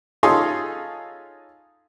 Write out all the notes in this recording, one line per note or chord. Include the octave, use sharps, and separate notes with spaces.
C#4 D#4 F4 G#4 A4 C6